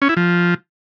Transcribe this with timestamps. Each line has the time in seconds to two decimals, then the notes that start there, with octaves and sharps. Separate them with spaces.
0.02 C#4
0.09 E4
0.17 F3